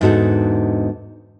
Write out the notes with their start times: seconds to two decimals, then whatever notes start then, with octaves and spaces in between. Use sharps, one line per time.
0.01 E2 G#2 D3 D#4 F#4 A4